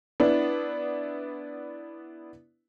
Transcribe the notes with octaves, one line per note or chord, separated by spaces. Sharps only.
B3 D4 E4